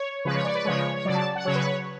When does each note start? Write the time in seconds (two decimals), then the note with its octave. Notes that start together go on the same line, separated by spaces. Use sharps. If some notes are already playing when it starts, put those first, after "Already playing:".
Already playing: C#5
0.25 C#3 F3 G#3 B4
0.35 C#5
0.45 D5
0.55 B4
0.65 C#3 F3 G#3 C#5
0.96 C#5
1.05 C#3 F#3 D5
1.15 A5
1.35 F#5
1.45 C#3 F#3 C#5
1.55 B4
1.66 C#5